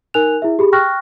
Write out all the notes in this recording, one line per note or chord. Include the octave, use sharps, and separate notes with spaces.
D#4 A#4 G#5 F#6 F7
E4 G#4 E5
G4 G#4 B5
G5 C#6 F6 F#6 A#6